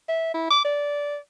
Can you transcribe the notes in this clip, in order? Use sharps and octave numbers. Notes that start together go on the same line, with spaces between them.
E5
E4
D6
D5